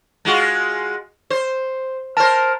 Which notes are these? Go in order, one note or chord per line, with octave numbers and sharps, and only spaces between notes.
G#3 F4 F#4
C5
A#4 C5 A5